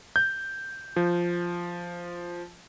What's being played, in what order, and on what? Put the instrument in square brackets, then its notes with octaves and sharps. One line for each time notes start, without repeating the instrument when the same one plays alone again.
[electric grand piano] G6
F3